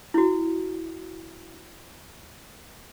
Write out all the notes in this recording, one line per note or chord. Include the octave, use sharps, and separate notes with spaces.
E4 F#4